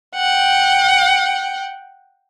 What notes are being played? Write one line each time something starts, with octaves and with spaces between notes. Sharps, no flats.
F#5 G5